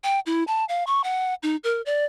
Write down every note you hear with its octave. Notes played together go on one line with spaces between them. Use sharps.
G5
E4
A5
F5
C#6
F#5
D#4
A#4
D5